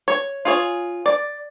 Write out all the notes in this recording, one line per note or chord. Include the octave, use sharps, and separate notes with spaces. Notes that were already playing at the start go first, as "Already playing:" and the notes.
C#5
F4 G#4 C#5
D5